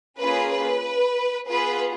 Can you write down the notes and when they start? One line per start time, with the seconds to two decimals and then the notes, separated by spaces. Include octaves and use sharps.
0.18 A#3 C#4 F4 G#4 B4
0.51 B4
1.48 B3 F4 G#4 B4